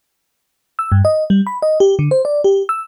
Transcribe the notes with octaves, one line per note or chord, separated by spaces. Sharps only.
E6
G2
D#5
G3
B5
D#5
G4
D3
C5
D5
G4
E6